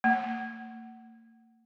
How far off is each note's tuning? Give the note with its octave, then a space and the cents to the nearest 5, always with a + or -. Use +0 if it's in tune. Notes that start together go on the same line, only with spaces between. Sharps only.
A#3 -45